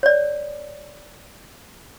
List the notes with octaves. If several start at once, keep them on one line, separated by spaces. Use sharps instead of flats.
C#5 D5